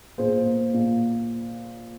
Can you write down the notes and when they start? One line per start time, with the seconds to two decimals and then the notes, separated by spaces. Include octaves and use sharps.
0.18 A#2 G#4 C5
0.45 A#3
0.73 A#2